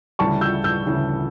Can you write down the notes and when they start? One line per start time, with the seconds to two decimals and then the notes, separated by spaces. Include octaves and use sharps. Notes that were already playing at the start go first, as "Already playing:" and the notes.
0.19 D2 C#3 E3 G3 A5 C#6
0.41 E6 G6
0.64 E6 G6
0.86 D2 C#3 E3 G3